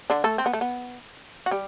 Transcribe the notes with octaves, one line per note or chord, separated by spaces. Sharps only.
D3 D4
A3 A4
C4
B3
A3
B3
F#4
G3 G4